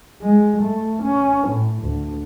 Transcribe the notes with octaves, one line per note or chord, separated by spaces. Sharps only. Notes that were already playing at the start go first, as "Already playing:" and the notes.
G#3
A3
C#4
A2
D2